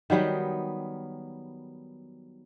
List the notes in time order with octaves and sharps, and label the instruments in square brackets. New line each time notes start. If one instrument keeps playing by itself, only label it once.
[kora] D#3 F#3 G3 B3